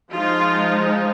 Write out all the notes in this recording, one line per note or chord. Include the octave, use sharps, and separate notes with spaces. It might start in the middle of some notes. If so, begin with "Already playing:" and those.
F3 G#3 D#4 F4